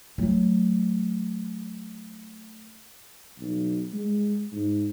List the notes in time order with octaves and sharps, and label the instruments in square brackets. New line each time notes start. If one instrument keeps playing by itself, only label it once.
[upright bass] F#3 A3
[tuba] B1
G#3
G#2